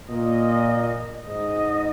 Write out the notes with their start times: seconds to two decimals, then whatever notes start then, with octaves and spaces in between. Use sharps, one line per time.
0.10 A#2 D#5
1.26 G#2 D#5